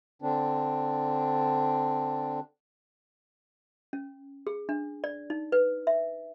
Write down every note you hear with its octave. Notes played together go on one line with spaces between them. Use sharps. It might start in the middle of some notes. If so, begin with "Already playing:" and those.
D3 C4 D4
C#4
G#4
D4
D5
D#4
B4
E5